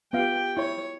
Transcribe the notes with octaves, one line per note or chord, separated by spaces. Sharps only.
B3 F4 G4 F5 G5
E4 C#5